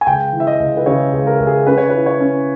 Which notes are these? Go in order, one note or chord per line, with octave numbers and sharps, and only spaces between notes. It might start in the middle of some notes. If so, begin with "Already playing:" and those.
G#5
C#2 G5
E3
E5
D#5
C#2
B4
C#3 C#5
C#2
A#4
C#2
G#4
C#4 B4
C#5
E4 B4
C#5
C#4